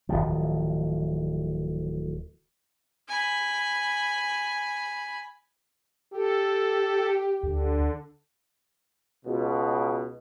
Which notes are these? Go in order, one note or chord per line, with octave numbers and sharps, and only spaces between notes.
D1 C#2 D#3 F3
G#5 B5
G4 A4
D2 D3
C#2 B2